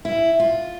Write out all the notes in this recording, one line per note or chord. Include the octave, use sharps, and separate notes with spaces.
E4
F4